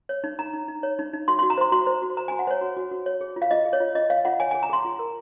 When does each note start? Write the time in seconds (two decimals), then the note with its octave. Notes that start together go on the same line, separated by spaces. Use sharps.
0.09 C#5
0.24 D#4
0.39 D#4 A#5
0.53 D#4
0.68 D#4
0.83 C#5
0.99 D#4
1.13 D#4
1.28 F#4 C6
1.39 C6
1.43 F#4
1.50 A#5
1.58 C5 C6
1.72 F#4 C6
1.87 C5
2.02 F#4
2.17 C5 A#5
2.28 G#5
2.32 F#4
2.39 F#5
2.47 C5 C#5
2.61 F#4
2.77 F#4
2.91 F#4
3.06 C#5
3.21 G#4
3.36 F4
3.42 F5
3.51 F4 D#5
3.65 G#4
3.73 C#5
3.80 F4
3.95 F4 D#5
4.10 C#5 F5
4.25 F4 F#5
4.40 C#5 G#5
4.51 G#5
4.54 G#4
4.63 A#5
4.69 G#4 C6
4.85 F4
4.99 A#4